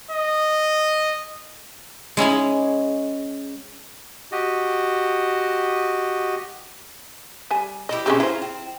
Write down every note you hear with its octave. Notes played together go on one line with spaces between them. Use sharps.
D#5
G#3 C#4 E4 G#4
F#4 G4 D#5
G3 G#5
F3 E4 G4 D#5
B2 G#3 C#4 D4 G4 E5
E4 F4 A#4 C5
C4